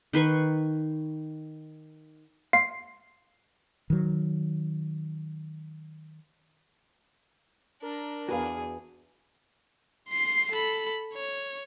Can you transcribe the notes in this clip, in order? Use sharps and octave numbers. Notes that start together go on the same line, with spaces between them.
D#3 B4 C6 C#6
F5 C6 C7
D#3 F#3
D4 A#4
E2 F#4 G#4 B4 F5
C6 C7
A4 B5
C#5